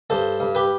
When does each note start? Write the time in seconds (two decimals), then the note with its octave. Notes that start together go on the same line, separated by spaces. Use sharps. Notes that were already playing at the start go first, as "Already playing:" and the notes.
0.10 G2 A4 C5
0.40 G2
0.55 G4 B4